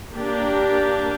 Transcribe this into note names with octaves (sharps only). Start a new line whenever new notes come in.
A#3 D4 G4